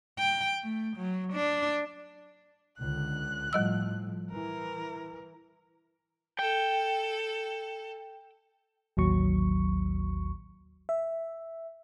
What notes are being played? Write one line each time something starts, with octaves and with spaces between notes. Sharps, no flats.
G5
A3
F#3
D4
C#2 D3 F#6
A2 F3 G3 D#5 E6
E3 A#4
A4 G5
A1 D#2 F#3 C#6
E5